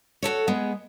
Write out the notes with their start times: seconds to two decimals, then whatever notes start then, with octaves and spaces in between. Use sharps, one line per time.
0.23 F#4 G4 A4 C#5
0.47 G#3 B3 G#4